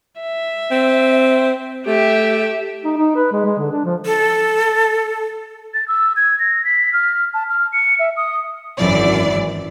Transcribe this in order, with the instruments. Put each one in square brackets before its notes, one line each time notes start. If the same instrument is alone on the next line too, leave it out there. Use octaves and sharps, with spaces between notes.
[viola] E5
[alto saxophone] C4
[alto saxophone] A3 [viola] G4 E5
[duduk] D#4
D#4
B4
G#3
G#3
D3
D4
F3
[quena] A4
[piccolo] A6
E6
G#6
A#6
B6
F6
A5
F6
C#7
E5
D#6
[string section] G#1 F#2 E3 D5